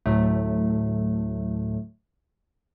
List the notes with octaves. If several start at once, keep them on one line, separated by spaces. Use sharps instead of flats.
D2 A2 F#3 A3